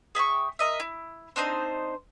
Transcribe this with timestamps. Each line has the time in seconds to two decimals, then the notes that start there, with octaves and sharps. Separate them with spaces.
0.15 G#4 E5 G5 C#6
0.59 A#4 D#5 E5
0.80 E4
1.36 C4 D4 D#4 C5